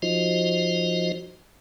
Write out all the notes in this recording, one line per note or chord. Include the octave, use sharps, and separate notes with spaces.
F3 D#4 F4 F#4 C5 D#5